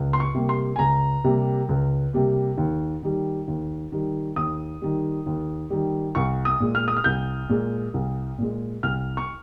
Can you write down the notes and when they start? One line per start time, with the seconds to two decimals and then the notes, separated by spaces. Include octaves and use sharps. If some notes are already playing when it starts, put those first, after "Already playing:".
Already playing: C#2
0.13 C6
0.20 C#6
0.34 C3 G3 A#3
0.49 C6
0.76 G#5
0.79 C#2 A#5
1.24 C3 G3 A#3
1.69 C#2
2.13 C3 G3 A#3
2.57 D#2
3.03 D#3 G3
3.48 D#2
3.92 D#3 G3
4.36 D#2 D#6
4.82 D#3 G3
5.26 D#2
5.70 D#3 G3
6.15 C2 C#6
6.45 D#6
6.60 A#2 G#3
6.75 F6
6.88 D#6
6.96 F6
7.04 C2 G6
7.49 A#2 G#3
7.94 C2
8.38 A#2 G#3
8.83 C2 F6
9.17 C#6